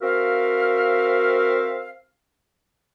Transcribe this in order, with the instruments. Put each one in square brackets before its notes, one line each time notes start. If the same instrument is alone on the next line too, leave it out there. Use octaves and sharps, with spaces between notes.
[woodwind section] C4 F#4 A#4 E5 F5